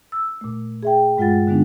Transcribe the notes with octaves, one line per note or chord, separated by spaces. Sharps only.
E6
A#2 A3
G#4 E5 G5
G2 G#3 F4 F#5 A6
D3 G#3 B3 D4 D#4